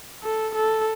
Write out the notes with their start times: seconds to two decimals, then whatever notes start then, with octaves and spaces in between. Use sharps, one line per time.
0.23 A4
0.55 A4